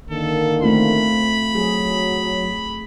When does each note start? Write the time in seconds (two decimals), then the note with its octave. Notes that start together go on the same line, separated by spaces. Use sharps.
0.10 D3 D#3 A#3 A4
0.62 A3 C4 F4 B5
1.55 F#3 G#4